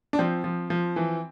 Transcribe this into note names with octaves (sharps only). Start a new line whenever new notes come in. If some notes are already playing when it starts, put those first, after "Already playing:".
D4
F3 C4
F3
F3
E3